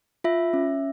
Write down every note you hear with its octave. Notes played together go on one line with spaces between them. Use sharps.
F4 E5
C#4